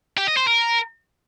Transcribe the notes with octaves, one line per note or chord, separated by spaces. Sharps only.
G4
D#5
C5
A#4